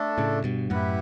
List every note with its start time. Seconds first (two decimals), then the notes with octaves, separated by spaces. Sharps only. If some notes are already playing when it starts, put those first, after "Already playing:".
Already playing: A3 D4 A4
0.18 A2 C#3
0.44 G2 B2
0.70 F#2 A2 E4 G4 B4 F#5